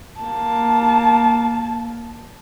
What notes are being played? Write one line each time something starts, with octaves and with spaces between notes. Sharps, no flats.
A#3 A5